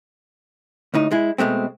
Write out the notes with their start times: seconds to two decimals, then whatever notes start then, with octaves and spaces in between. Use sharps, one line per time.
0.94 D2 A2 D#4
1.11 G#3 E4
1.38 B2 G#3 A3 C4